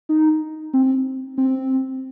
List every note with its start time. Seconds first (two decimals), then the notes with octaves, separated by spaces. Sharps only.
0.09 D#4
0.74 C4
1.38 C4